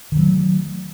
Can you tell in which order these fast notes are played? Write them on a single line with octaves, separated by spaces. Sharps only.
D#3 F#3 A3